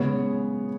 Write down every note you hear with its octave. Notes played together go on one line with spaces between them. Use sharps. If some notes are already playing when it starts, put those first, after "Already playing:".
Already playing: C#3 G#3 B3 C#5